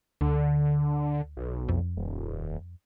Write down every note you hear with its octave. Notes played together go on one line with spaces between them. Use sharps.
D2 D3
B1
F2
D#1